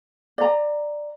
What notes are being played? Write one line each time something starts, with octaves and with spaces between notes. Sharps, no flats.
D5 A#5